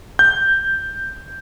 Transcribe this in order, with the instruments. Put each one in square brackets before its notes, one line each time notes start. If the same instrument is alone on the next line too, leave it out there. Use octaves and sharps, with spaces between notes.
[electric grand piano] G6